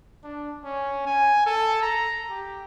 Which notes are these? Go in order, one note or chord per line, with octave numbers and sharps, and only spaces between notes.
D4
C#4
G#5
A4
A#5
G4